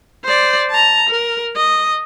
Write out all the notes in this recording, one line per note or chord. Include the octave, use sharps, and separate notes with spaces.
C5 D5
A5 A#5
A#4
D#5